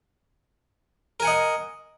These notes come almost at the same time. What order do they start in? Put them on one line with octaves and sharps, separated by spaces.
A#4 G#5 F#5 D#5